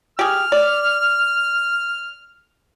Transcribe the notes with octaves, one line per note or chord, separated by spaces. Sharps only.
G4 G#4 F6
D5